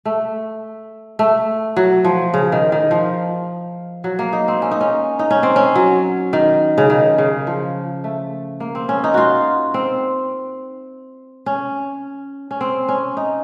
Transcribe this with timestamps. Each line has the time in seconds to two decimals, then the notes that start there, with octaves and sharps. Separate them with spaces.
0.05 A3
1.19 A3
1.76 F#3
2.04 F3
2.34 C#3
2.52 D#3
2.72 D#3
2.91 F3
4.04 F#3
4.19 A#3
4.33 D#4
4.48 C4
4.62 C#4
4.71 D#4
4.81 C#4
5.19 D#4
5.31 C#4
5.43 C4
5.56 C#4
5.75 F#3
6.33 D#3
6.78 C#3
6.90 D#3
7.18 C#3
7.47 F3
8.04 A3
8.60 A#3
8.75 C4
8.89 C#4
9.04 D#4
9.14 F4 F#4
9.74 C4
11.46 C#4
12.51 C#4
12.61 C4
12.89 C#4
13.17 D#4